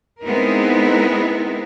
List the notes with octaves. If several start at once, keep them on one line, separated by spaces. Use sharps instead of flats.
G#3 B3 C4 D#4 E4 A#4